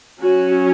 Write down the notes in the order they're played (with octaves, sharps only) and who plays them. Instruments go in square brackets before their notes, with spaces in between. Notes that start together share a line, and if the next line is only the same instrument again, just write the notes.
[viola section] F#3 C#4 F#4